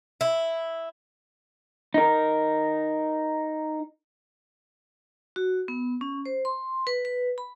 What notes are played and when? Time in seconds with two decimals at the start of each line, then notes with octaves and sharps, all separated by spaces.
0.21 E4
1.94 D#4 A#4
5.36 F#4
5.68 B3
6.01 C#4
6.26 C5
6.45 C6
6.87 B4
7.05 B4
7.38 B5